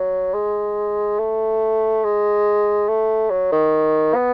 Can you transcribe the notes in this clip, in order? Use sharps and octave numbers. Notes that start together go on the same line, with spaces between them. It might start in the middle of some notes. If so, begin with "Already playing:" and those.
Already playing: F#3
G#3
A3
G#3
A3
F#3
D#3
B3